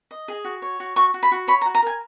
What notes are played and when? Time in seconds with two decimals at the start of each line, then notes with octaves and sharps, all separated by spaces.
0.11 D#5
0.28 G#4
0.44 F#4
0.62 C#5
0.80 F#4
0.96 F#4 C#6
1.14 F#4
1.23 B5
1.32 F#4
1.48 C#5 B5
1.61 A#5
1.66 F#4
1.75 A#5
1.82 A#4 G#5